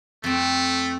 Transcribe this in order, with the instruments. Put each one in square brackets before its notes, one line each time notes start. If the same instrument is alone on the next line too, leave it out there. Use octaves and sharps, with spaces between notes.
[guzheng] F2 C4 [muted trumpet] A3